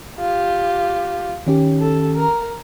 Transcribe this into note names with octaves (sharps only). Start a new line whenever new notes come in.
F4 G4
D#3 C#4 G4
A4
A#4 A#5